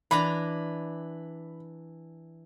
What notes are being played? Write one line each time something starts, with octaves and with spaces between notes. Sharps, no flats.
E3 D4 A#5 B5